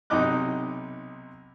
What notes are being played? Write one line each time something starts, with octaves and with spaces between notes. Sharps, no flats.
B1 C3 D#4 D#5 D6 F#6